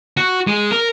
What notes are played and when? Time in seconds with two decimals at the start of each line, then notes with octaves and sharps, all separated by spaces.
0.17 F#4
0.47 G#3
0.71 A#4